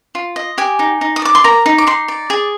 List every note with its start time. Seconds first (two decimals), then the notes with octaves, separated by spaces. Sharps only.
0.15 F4
0.36 D#5
0.58 G4 G#5
0.79 D#4
1.01 D#4
1.16 D#6
1.22 D5 D6
1.35 C6
1.44 A#4 A#5
1.66 D#4
1.78 D6
1.87 D#4 C6
2.08 D5
2.30 G#4